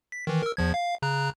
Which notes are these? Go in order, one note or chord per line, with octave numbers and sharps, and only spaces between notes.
B6
D#3 E3
A#4 E6
E2 F3 G#6
F5
C#3 A#5 F#6